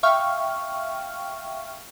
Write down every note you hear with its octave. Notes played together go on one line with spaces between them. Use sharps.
E5 F5 G5 C#6 F6